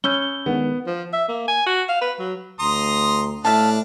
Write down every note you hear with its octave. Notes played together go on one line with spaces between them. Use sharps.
C#4 B5 E6 G6 G7
D#3 G#3 B3 D4
F3
E5
A#3
G#5
F#4
F5
B4
F#3
D2 A#5 C6 D#6
A2 D4 E5 F5 A5